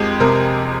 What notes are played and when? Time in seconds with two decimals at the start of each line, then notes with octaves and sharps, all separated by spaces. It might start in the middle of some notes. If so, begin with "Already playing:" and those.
Already playing: F2 G#3 G4
0.20 C3 A#4